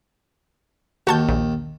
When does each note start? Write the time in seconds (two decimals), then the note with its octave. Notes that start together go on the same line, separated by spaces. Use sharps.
1.07 D#2 F#4 A5 G6
1.28 A#1